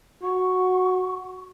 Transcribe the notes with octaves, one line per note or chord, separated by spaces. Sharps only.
F#4 C#6